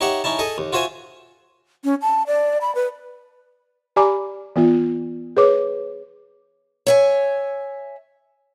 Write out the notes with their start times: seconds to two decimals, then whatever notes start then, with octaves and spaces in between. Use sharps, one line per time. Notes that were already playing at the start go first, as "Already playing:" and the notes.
0.01 D#4 G4 C#5 E5 F#5
0.24 C#4 D#4 E4 A5
0.39 G#4 A4 D#5
0.58 D#2
0.73 F4 F#4 C5 E5 G#5
1.85 C#4
2.02 A5
2.27 D5
2.61 B5
2.75 B4
3.96 G4 D5 G#5 A#5 B5 D6
4.56 E3 B3 F4
5.37 G#4 B4 C#5 D6
6.87 C#5 E5 G#5